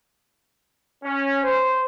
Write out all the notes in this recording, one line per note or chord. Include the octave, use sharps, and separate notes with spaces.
C#4
C5